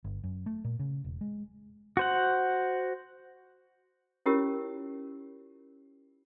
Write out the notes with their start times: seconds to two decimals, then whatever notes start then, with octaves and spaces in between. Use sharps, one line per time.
0.04 G1
0.24 F#2
0.46 A3
0.64 A#2
0.79 C#3
1.04 E1
1.21 G#3
1.97 F#4 C5 F#5
4.26 C#4 E4 F4 G4 A#4 C#5